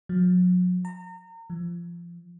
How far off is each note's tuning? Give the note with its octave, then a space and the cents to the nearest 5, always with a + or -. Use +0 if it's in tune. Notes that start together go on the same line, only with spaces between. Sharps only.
F#3 -40
A#5 -35
F3 -25